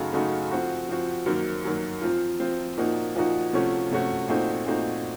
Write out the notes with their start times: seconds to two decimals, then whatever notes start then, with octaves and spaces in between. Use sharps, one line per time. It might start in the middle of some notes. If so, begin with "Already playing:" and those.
Already playing: F#2 C#3 A3 D#4 F#4
0.13 F#2 C#3 A3 D#4 F#4
0.51 F3 C4 F#4
0.89 F3 C4 F#4
1.26 F#2 D#3 F#3 A#3
1.64 F#2 D#3 F#3 A#3
2.02 F3 C4 F4
2.40 F3 C4 F4
2.77 A#2 F3 A#3 D#4 F#4
3.16 A#2 F3 A#3 D#4 F#4
3.53 C3 F3 A3 C#4 F#4
3.91 C3 F3 A3 C#4 F#4
4.28 A#2 A3 C4 D#4 F#4
4.66 A#2 A3 C4 D#4 F#4